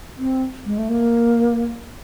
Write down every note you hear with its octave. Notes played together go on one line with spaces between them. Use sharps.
C4
G#3
A3
A#3